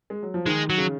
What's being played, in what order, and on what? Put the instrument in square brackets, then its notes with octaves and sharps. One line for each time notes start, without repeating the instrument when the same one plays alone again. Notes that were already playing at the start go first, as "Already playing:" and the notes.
[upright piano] G#3
F#3
F3
[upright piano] D#3 [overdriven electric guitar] G#3
[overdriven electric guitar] F#3
[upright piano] C#3